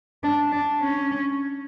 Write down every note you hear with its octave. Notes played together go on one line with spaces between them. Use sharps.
D4
D4
C#4